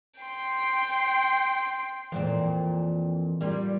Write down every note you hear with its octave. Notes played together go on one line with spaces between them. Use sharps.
G5 C6
F2 A#2 E3 C4
G3 A#3 F4